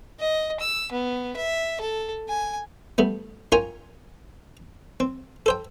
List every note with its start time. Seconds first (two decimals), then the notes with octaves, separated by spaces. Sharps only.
0.20 D#5
0.60 E6
0.91 B3
1.36 E5
1.80 A4
2.28 G#5
2.98 G3 A3 B3
3.52 C#4 F4 A#4 G5 G#5
5.00 C4
5.46 A4 C5 G5